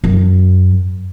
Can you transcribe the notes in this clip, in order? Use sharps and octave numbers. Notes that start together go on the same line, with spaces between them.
F#2